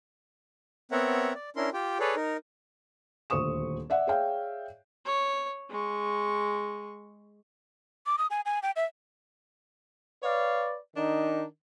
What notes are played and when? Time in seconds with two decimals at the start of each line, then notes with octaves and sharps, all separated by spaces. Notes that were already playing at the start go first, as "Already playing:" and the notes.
0.92 B3 C4 A#4 C#5 E5 F#5
1.34 D5
1.56 C#4 D4 E4 A#4 C6
1.73 F4 G4 G5
2.00 G#4 A4 B4 C#5 D5
2.16 D#4 A#4
3.30 D#1 D2 C5 C#6 D#6 E7
3.90 D5 E5 F#5
4.07 G#4 C#5 D5 E5 F5 G5
5.06 C#5
5.70 G#3 C#6
8.06 D6
8.18 D#6
8.30 G#5
8.46 G#5
8.63 G5
8.76 E5
10.22 B4 C#5 D5 F5
10.96 D#3 D4 D#4